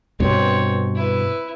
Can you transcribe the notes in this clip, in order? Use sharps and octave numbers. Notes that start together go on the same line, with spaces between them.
G2 B2 C4 C#5
E4 B4